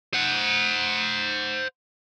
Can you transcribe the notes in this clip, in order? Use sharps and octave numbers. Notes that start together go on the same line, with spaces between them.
C5 F#5